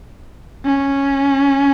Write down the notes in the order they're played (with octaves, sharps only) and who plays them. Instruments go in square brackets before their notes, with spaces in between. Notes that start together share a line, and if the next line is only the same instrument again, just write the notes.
[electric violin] C#4